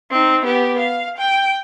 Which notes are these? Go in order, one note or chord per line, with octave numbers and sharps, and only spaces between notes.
C4 D#4
B3 G4
F5
G5